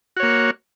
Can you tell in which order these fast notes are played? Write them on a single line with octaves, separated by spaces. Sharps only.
F#4 C#5 A#3